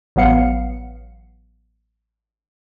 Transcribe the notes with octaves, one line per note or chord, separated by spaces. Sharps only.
A1 F#3 B3 F5 C#7